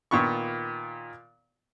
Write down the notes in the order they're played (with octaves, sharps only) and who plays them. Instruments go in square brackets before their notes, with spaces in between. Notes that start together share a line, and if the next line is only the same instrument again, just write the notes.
[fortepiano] A#2 D#3 B3 F4 C#6